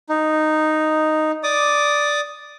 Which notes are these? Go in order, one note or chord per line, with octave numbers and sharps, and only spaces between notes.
D#4
D5 D6 D#6